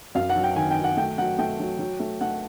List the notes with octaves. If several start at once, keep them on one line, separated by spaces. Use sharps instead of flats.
F#2 F5
F#5
F#3
G5
D#3 G#5
G5
F#3
F#5
A3 G5
F#3 F#5
A3 G5
F#3
F#3
A3
A3 F#5